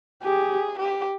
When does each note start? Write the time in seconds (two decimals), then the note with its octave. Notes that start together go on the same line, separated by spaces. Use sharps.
0.23 G4 G#4
0.79 G4